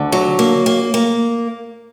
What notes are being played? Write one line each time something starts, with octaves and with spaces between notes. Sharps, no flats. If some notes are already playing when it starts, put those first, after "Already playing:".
Already playing: D2 D3
F#3
A#3
A#3
A#3